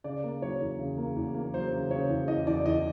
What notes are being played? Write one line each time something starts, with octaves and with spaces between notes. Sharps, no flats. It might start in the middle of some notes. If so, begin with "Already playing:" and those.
C#3 D5
A#3
F#3 C#5
E2
C#3
A#3
E2
A#3
F#3 C5
C#3
C#3 C#5
E2
E2 D#5
E2 D5
E2 D#5